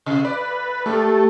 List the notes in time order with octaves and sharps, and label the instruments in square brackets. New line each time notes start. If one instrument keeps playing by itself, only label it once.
[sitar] C3
[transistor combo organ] B4 [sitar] D5
[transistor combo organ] A3 [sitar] G4 A#4